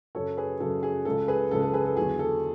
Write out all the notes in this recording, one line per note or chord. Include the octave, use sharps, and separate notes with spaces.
F#2 C#3 F#3 C#4 A4 C#5
G#4 B4
F#2 C#3 F#3 C#4 A4
G#4
C#2 C#3 G#3 A4
G#4 B4
C#2 C#3 G#3 A4
A4
G#4 B4
A4
E2 D3 F#3 G#4
A4